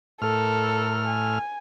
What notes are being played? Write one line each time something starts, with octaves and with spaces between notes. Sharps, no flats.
A2 A4 A#4 F6
G#5